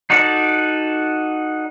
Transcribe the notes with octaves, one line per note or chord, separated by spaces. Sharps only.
D#4 F#4 A4 D5